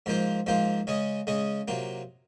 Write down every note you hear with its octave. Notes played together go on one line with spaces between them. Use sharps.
G#2 F3 A#3 F4 C5
G#2 F3 A#3 F4 C5
C#3 G#3 C#4 G#4 D#5
C#3 G#3 C#4 G#4 D#5
C3 F#3 A#3 F4